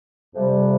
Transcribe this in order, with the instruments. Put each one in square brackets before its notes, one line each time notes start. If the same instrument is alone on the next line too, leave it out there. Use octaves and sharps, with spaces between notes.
[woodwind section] F2 C3 G3